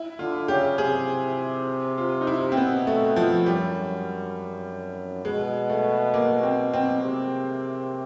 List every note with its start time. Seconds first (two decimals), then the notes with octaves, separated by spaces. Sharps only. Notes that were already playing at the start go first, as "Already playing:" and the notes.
Already playing: E4
0.19 D3 F4
0.48 C#3 G4
0.78 C3 G#4
1.98 F4
2.21 D#4
2.27 E4
2.52 C4
2.57 B2 B3
2.87 A3
3.16 F3
3.46 F#2 G3
5.25 B2 G#3
5.69 A3
6.14 A#3
6.43 C4
6.73 C4
7.03 C3